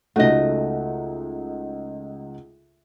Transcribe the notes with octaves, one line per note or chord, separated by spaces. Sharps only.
C#2 A3 D#4 F#4 D#5 F#5